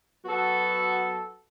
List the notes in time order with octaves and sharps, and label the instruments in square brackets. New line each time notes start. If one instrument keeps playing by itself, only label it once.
[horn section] F#3 B3 F#4 A4